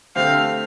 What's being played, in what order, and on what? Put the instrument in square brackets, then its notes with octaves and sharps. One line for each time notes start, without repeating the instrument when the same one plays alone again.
[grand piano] D3 A3 C4 G4 [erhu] F5